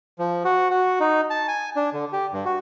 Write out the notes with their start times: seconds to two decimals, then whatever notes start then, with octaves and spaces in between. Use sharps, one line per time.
0.19 F3
0.45 F#4
0.70 F#4
1.00 D#4
1.30 A5
1.48 G#5
1.76 D4
1.93 D3
2.13 G4
2.33 G2
2.45 F#4